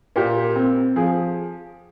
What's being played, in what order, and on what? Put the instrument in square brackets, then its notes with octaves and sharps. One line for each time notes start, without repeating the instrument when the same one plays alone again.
[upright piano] A#2 G4
C4
F3 G#4